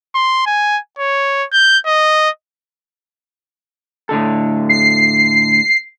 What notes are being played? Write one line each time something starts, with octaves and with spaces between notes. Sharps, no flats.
C6
G#5
C#5
G6
D#5
A2 D3 A4
C7